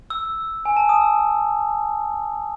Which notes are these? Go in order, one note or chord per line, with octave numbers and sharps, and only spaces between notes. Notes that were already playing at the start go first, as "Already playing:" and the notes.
E6
G#5
A5
D#6
E6